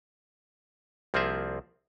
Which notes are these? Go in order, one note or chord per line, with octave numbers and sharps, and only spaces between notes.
C2 F3 A#3 C4 G#4 E5